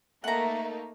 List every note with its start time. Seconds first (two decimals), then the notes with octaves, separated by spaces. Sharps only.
0.24 A3 A#3 D#4 E5 F#5 A#5